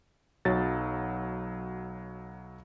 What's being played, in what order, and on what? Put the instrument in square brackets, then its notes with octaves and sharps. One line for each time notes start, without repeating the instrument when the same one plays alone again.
[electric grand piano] B1 F#3 A6